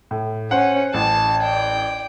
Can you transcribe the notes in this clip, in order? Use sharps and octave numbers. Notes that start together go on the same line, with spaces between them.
A2
C#4 C5 F#5
A1 A5
D5 G5